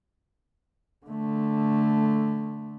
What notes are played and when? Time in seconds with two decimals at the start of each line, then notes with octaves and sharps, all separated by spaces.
1.06 D3 A3